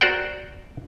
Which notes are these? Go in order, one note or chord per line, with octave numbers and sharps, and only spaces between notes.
F#4 A#4 C5 D5 F#5 G5